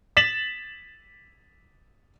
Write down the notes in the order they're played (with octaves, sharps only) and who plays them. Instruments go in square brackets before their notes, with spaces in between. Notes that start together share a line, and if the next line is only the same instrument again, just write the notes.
[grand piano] A6 B6 E7 F#7